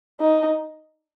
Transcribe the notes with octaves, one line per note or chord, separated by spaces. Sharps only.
D#4